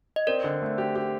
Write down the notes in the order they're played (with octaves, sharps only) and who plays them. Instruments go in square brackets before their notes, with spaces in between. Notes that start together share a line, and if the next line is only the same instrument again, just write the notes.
[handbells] D#5
[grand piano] C4 [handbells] A#4 D5
[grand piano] D3
A3
G4
G4